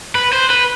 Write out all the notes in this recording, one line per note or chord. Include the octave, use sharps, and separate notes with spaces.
B4
C5
B4